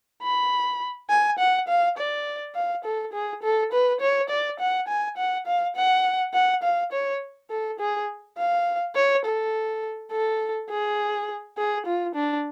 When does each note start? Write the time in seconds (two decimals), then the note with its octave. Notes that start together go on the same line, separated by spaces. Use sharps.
0.22 B5
1.10 G#5
1.39 F#5
1.68 F5
1.98 D5
2.55 F5
2.84 A4
3.13 G#4
3.43 A4
3.72 B4
4.01 C#5
4.29 D5
4.60 F#5
4.88 G#5
5.17 F#5
5.47 F5
5.76 F#5
6.34 F#5
6.63 F5
6.92 C#5
7.50 A4
7.80 G#4
8.38 F5
8.95 C#5
9.25 A4
10.11 A4
10.70 G#4
11.58 G#4
11.86 F4
12.15 D4